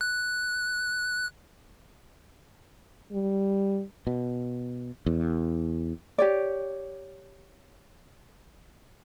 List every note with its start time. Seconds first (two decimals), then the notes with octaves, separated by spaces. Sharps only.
0.01 F#6
3.12 G3
4.07 B2
5.06 E2
6.18 G4 C#5 D5